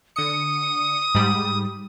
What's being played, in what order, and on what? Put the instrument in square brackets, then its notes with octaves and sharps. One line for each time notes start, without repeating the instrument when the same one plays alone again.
[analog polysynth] D3 C#7 [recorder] D#6
[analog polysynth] G#2 G3